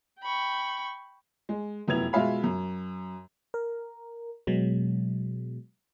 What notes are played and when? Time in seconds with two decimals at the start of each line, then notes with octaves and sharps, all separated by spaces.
0.21 G5 B5 C#6
1.49 G#3
1.88 F1 F#2 B3 E4 G#6 F7
2.13 B2 G#3 F4 E5 F5 B5
2.44 F#2
3.54 A#4
4.47 B2 F#3 G#3